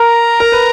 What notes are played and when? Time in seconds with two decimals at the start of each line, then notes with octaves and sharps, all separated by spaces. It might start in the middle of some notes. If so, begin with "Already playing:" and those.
Already playing: A#4 A#5
0.40 A#4
0.52 B4